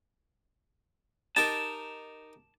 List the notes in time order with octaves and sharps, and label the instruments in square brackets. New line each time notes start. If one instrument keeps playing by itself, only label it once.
[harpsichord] D#4 G4 A#4 [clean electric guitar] A5